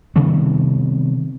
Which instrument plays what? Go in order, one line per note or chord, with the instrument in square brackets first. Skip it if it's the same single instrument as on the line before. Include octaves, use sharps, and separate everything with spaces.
[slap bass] C3 D#3 G3 B3